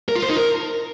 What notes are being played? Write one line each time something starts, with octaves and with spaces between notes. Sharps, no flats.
A#4
F4
C5
D#4
A#4